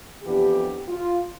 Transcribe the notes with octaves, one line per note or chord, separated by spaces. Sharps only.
F2 E3 B3 D4 G4
F4